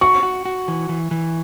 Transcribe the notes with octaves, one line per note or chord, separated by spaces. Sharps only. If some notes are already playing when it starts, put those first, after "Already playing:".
F#4 C#6
F#4
F#4
E3
E3
E3